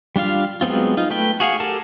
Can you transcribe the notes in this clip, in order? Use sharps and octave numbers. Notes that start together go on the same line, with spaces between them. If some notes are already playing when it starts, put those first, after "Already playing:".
G3 D4 F4 F5
F#3 G#3 B3 C4 F4
D#4 F4
A3 B4 G5
F#4 G#4 F5 F#5
G4 A4 A#4 A5